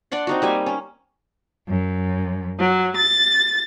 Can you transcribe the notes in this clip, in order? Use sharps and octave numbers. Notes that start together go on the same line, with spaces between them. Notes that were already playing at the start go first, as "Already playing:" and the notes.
D4 D5 F#5 C6
C4 D#4 F#4
G3 A#3 G#5
C#4
F#2
F#3
A6